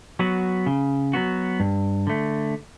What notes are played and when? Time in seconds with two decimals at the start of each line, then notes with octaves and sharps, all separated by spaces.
0.19 F#3 B3 F#4
0.66 C#3
1.13 F#3 B3 F#4
1.60 G2
2.07 D3 A3